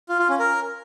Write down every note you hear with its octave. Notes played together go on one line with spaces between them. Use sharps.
F4
F4
C#4
A#4